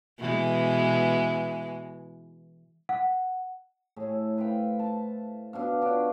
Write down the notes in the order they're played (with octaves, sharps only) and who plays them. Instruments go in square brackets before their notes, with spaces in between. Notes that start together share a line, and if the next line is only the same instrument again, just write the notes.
[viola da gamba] B2 E3 G#3
[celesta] F#5
[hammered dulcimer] A2 A3 E4 G#4
B4 C5 F5 G5
A5
B2 D4 F5
D4 F4 C#5